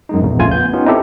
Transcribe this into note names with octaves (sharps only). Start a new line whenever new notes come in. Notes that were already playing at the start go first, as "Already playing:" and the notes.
F#2 G#3 D#4
A#1 E2
A1 C#3 A3 F4 G#5 G#6
B3 G6
B3 C#4 D#4 F4 G4
C4 D#4 E4 G4 A4